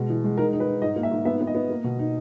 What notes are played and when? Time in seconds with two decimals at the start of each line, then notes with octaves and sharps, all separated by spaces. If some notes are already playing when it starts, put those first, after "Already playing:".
Already playing: B2 G#3
0.09 E3
0.24 G#3
0.37 D#4 A#4
0.53 D#4
0.60 B4
0.68 D#4
0.82 G#2 D#5
0.96 A#3
1.03 E5
1.11 G#2
1.25 B3 E5
1.41 B3
1.47 D#5
1.55 B3
1.70 A#3
1.84 B2
1.99 D#4